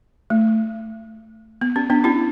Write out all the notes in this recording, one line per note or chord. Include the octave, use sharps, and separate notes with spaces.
A3
B3
C#4
B3 D4
C#4 E4